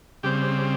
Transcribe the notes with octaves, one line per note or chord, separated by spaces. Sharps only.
C#3 G3 C4 G4